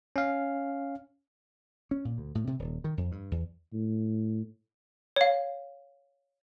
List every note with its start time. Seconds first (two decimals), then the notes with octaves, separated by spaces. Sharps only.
0.16 C#4 F5
1.91 C#4
2.05 A#2
2.18 D2
2.35 A2
2.47 C3
2.59 D#1
2.84 D#3
2.97 F2
3.12 G2
3.31 E2
3.73 A2
5.16 C#5 F5